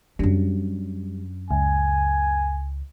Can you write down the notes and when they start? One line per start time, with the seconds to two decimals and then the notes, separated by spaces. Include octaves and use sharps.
0.19 F#2 G3 D4
1.51 C#2 G#5